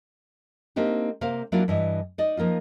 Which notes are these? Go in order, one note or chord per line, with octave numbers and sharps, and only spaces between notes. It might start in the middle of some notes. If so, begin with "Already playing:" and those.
A#3 C4 D4 D#4 G4
C3 A#3 C5 F5
F#3 A#3 D4 E4 F4
G2 E3 D#5
D#4 D5 D#5
F3 A#3 D#4 F4